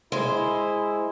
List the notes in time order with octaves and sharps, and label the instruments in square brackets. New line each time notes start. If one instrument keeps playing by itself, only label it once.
[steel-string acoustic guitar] G#3 C5 [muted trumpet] E4